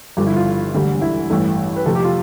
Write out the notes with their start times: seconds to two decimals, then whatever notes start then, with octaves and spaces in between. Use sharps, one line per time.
0.17 G1 G2 F3 G4
0.27 E4
0.36 F4
0.73 E1 D2 D3 G3
1.02 E4
1.30 A1 G2 E3 A3
1.76 B4
1.86 F2 C3 F3 A3 A4
1.95 G4
2.05 F4